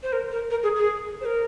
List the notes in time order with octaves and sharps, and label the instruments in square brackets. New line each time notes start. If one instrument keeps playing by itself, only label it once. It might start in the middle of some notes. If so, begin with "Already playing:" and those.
[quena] C5
A#4
A#4
A#4
G#4
G#4
C5
A#4